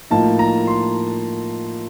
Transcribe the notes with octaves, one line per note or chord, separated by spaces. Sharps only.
A2 F3 A#3 D#4 A5
A#5
C6